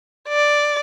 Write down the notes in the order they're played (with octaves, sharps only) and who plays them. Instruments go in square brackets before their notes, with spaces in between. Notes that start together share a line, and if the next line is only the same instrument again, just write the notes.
[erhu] D5